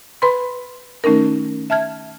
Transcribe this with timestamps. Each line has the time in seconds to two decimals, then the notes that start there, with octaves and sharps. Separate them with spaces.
0.22 B4 B5 C6
1.04 D#3 A3 C#4 D#4 A#4
1.70 E5 A5 F6 G#6